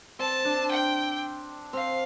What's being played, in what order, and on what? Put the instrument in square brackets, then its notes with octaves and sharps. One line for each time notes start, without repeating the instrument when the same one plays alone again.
[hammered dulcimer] C4 [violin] A5
[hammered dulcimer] D4
[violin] G5
[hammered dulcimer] C4 [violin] F5